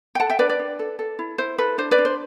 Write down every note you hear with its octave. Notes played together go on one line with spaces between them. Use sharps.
G5
A4 F#5 A5
E5 G5
D4 B4 D5
B4 D5
D4
A4
A4
E4
E4 C5
A4 B4
D4 C5
B4 D5
D4
C5